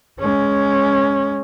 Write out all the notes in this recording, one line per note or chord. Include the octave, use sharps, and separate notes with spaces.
G#3 C#4